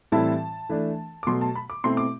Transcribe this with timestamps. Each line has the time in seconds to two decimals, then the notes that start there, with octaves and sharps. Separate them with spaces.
0.12 A2 E3 G3 C4 E4 A5
0.69 E3 A3 D4
1.23 D6
1.27 B2 F#3 A3 C6
1.41 A5
1.56 B5
1.70 D6
1.84 B2 A3 C4 E4 C6
1.97 D6